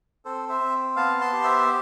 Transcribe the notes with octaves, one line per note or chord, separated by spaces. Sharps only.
C4 A4 C5
C5 E5
C4
B3 F5 A5
A5 C6
G4
C5 E5